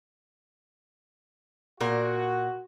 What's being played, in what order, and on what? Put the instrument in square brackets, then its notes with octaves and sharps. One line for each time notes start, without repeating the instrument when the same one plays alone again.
[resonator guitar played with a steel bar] A#2 A#4 [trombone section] F#4